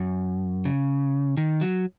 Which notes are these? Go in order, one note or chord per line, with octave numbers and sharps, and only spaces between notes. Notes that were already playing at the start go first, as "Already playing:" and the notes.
Already playing: F#2
C#3
D#3
F#3